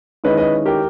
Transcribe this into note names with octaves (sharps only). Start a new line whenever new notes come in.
D#3 G#3 C#4 E4 B4 D#5
B4 D#5
G4 A#4